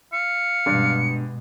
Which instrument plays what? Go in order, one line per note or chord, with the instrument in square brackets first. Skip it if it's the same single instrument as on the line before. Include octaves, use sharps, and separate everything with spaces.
[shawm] F5 [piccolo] C#7
[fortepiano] G2 [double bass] B2 G#3